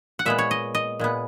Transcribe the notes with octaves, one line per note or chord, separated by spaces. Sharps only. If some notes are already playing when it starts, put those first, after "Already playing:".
F#5
A#2 G#3 B3 E5
C#5
D#5
D#5
A#2 G#3 B3